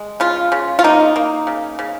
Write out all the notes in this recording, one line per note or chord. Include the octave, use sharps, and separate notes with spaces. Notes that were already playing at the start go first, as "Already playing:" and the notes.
Already playing: G#3
C#3 F4
C#3
F4
A#3 D#4
A#3
C#3
C#3